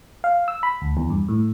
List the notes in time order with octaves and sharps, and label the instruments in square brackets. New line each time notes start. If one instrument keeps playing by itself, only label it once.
[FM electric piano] F5
E6
B5
D2
E2
G2
A2